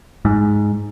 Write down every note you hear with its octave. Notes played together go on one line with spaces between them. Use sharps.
G#2